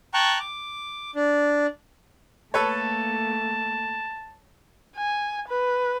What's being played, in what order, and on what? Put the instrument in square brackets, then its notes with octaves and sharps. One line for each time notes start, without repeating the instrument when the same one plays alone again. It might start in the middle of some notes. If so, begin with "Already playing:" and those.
[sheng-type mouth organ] G5 A5 A#5 C#6 F#6
D6
D4
[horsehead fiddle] A3 A#3 [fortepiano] A4 B4 C#5 [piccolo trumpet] A5
[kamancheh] G#5
B4